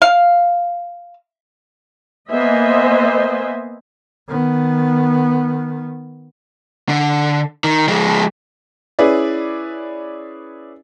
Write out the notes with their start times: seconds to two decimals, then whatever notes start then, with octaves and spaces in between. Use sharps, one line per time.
0.02 F5
2.30 A#3 B3 C5 D#5 E5 G#5
4.29 D#3 B3
6.89 D3
7.64 D#3
7.88 F3 G#3
8.99 C#4 E4 G#4 B4 D5